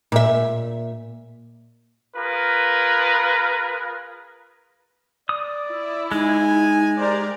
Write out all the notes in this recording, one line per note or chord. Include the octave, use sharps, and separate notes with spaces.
A#2 E5
F4 G#4 A#4 B4
D5 D#6
E4
G#3 D#4 G#5
G4 A#4 C5 D5